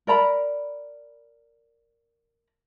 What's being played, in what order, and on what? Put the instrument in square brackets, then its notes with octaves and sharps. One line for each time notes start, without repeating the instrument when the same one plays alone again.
[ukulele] A#4 D5 A#5 B5